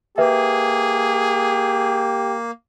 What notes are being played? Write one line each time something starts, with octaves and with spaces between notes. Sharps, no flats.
A#3 G4 G#4 B4 E5